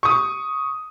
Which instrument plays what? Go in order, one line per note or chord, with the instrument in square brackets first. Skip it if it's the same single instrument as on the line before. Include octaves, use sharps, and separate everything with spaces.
[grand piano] C#6 D#6